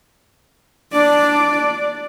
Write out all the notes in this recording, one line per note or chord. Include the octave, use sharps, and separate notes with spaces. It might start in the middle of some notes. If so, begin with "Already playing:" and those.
D4 D5